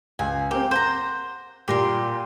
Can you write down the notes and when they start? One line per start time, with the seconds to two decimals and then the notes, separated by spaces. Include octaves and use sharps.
0.19 C#2 G#5
0.51 A#3 C4 G4
0.71 C5 F#5 A#5 G6
1.68 A#2 G3 G4 A#4 C6